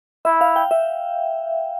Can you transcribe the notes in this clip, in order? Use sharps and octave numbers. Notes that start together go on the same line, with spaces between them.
E4 E5
F5
G5
E5